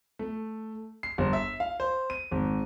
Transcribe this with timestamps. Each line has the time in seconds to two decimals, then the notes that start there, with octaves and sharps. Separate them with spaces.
0.19 A3
1.03 C7
1.18 G1
1.33 E5
1.60 F5
1.80 C5
2.10 D#7
2.31 G#1